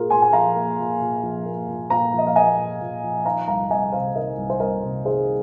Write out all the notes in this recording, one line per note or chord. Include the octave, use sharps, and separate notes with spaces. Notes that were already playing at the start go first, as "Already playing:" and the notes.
Already playing: A#2 A#3 F4 G#4 A#4
A#2 G#5 C6
G#5
F3 F5 A#5
A#3
A#2
A#2
F3
A#3
A#2
A#2 F5 A#5
F3 D#5
F5
A#3 D#5 G#5
A#2
A#2
F3
D#3 F5 A#5
C2 F5 A#5
C2 D#5 G#5
C3 C5 F5
D#3 A#4 D#5
C2
C5
C2 A#4 D#5
C3
D#3 G#4 C5